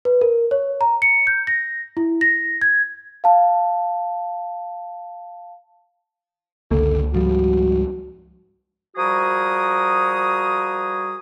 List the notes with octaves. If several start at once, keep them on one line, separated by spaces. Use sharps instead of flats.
B4
A#4
C#5
A#5
C#7
G6
A#6
E4
A#6
G#6
F5 A5
F#1 C#2 D3 A#3 A4
G#2 F3 G3 F#4
F3 G3 F#4 G#4 A#4 D#6